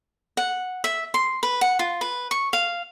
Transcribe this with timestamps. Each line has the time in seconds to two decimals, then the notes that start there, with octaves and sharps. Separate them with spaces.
0.37 F#5
0.84 E5
1.14 C6
1.43 B4
1.61 F#5
1.79 F4
2.01 B4
2.31 C#6
2.53 F5